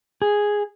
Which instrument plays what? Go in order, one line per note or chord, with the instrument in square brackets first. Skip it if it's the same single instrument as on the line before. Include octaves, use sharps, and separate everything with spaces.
[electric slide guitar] G#4